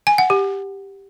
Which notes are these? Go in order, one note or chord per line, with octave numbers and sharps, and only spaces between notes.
G#5
F#5
G4